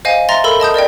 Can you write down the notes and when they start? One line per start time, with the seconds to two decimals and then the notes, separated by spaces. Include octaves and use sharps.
0.05 C5 D#5 F5 G#5
0.29 E5 A#5 C6 A6 A#6
0.44 A4 A#4 B5 E6
0.60 D#5 A5 D#6 G6
0.74 A#4 D5 D#5 G5